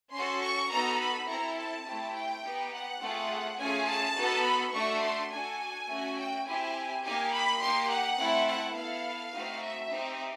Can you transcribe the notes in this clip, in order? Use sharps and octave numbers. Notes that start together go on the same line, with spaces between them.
C#4 F#4 A4 C6
C#6
B3 D#4 F#4 A4 A#5
B5
C4 E4 A4 A#5
A5
A3 C4 E4 G4
G5
B3 D#4 G4
F#5
A3 C4 F4 G#4
A3 C#4 F4 G#4 G#5
A5
B3 D#4 F#4 A4
B5
A3 D4 F#4 A4 C#6
C6
D4 F#4 A4 G#5
A3 C#4 F#4
G5
C4 E4 G4 G#5
A#3 D#4 G4 G#5
B5
A#3 D#4 G4 C6
F#5
A3 C4 E4 A4
F#5
B3 E4 A4 F5
A3 C4 D#4 F#4
E5
C4 D#4 G4